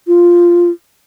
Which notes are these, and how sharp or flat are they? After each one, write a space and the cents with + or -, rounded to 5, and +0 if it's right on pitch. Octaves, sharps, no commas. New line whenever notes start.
F4 -5